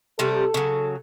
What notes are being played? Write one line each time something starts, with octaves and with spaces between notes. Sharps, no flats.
C3 G3 A3 A4
C#3 F#3